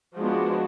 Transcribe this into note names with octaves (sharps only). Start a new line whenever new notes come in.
F3 G#3 B3 D4 F#4